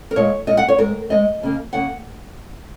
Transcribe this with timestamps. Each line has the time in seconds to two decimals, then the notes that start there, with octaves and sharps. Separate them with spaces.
0.11 A#4
0.16 A#2 G#3 C#5
0.47 A#2 G#3 D#5
0.57 F#5
0.68 C#5
0.78 G#2 G#3 A#4
1.09 G#2 G#3 D#5
1.41 D#2 C#3 A#3
1.73 C#3 A#3 F#5